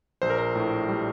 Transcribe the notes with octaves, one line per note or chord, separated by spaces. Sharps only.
A#1 C5
A#4
C5
A2
G3